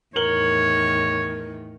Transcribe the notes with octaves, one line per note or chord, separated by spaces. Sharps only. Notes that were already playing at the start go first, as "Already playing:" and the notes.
E2 A2 D#3 A#4 C#5 F#7 G7